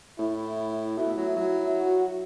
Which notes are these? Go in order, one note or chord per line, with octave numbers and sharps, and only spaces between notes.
A2 E4
B2 E4
F#3
F#3 E4
F#4